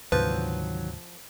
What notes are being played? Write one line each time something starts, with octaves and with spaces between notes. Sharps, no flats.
D2 G#2 C3 D#3 F3 F#3 B4 G6